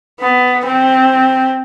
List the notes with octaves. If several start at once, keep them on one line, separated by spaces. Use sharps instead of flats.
B3
C4